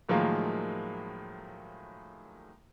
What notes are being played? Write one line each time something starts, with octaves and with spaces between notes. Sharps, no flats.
A2 D#3 F3 F#3 G#3 A#3